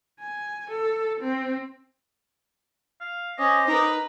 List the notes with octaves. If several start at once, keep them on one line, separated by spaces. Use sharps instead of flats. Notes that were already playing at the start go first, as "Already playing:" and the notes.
G#5
A4
C4
F5
C#4 C5 D#5 D6 D#6
D#4 A#4 B4